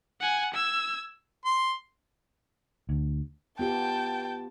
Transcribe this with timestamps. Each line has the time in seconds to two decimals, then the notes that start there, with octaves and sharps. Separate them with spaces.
0.20 F#5 G#5
0.54 E6 G#6
1.45 C6
2.89 D2
3.59 B3 F4 G4 G5 A5